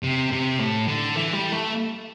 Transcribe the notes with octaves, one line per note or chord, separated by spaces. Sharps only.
C3
C3
A2
D3
E3
G3
A3